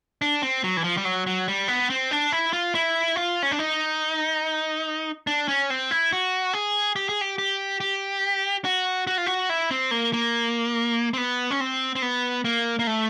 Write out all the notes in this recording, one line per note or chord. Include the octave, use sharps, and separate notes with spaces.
D4
C4
F#3
E3
F3
G3
F#3
F#3
G3
B3
C4
D4
E4
F4
E4
F4
C#4
D4
D#4
D4
C#4
C4
E4
F#4
G#4
G4
G#4
G4
G4
G4
F#4
F#4
F4
F#4
E4
C4
A#3
A#3
C4
B3
C#4
C4
C4
B3
A#3
A#3
A3